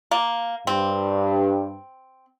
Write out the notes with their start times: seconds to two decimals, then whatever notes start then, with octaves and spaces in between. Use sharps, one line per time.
0.11 A#3
0.67 G2 C4